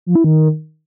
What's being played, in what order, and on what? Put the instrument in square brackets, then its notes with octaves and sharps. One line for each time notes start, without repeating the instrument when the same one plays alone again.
[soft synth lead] F3
E4
D#3